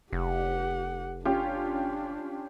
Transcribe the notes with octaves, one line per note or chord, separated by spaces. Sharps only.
F1 G4 F#5
C#4 D4 F4 G4